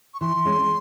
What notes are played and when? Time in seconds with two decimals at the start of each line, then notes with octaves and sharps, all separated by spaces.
0.14 C#6
0.20 E3 C6
0.45 G#3 C#4